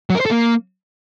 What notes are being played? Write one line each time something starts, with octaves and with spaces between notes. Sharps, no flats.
F#3
A#4
C5
A4
A#3